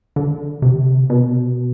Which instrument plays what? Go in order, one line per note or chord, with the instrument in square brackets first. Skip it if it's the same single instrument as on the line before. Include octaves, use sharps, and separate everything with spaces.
[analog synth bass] D3
C3
B2